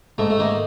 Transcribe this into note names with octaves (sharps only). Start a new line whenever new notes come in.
G#2 A3
A3
D#3 A#3